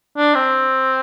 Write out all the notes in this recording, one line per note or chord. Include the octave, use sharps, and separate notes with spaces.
D4
C4